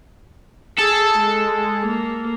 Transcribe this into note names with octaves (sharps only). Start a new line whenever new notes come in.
G#4 A4
G#3
A#3